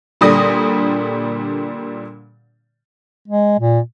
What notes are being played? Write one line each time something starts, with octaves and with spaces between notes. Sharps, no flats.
A#2 D3 G3 D#6 A#6
G#3
A#2